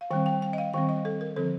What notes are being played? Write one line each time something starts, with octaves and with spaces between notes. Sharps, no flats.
F5
D#3 G3 C4 G5
G5
G5
D#5
F5
D#3 G3 C4 G5
D#5
A4
A#4
D3 F3 C4 A4